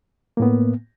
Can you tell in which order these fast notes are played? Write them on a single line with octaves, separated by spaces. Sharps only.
A#3 A2 B3